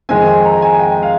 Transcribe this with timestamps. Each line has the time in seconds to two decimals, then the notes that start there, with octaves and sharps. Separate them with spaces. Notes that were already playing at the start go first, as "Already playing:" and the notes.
0.09 F2 D#3 G#3 C4 G#5
0.27 G#5
0.45 A#5
0.62 G#5
0.79 G5
1.03 F5